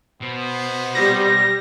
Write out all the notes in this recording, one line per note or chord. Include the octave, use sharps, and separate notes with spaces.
B2 B3 C5
G3 A#6